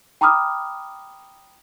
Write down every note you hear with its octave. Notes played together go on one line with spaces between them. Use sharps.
G5 A#5 B5 D6 D#6 F6